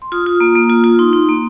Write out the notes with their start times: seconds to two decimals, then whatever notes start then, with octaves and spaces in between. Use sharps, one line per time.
0.02 C6
0.12 F4 D#6
0.27 F4
0.40 A#3
0.56 A#3
0.70 F4
0.84 F4
0.99 D#4 C6
1.13 D#4
1.28 A#3